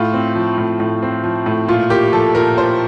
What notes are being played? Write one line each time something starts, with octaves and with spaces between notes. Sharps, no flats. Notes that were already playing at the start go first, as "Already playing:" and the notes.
Already playing: A2 F4
C4
F3
A2
A2
C4
F3
A2
A#2 F4
A#3 G4
F3 A4
A#2 A#4
A#2 C5